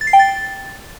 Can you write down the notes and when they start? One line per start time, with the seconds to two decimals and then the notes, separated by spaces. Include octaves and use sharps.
0.01 A6
0.07 C7
0.13 G5
0.19 A6